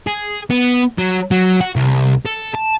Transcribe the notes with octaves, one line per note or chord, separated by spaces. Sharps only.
G#4
B3
F#3
F#3
F#4
C2
A4
A5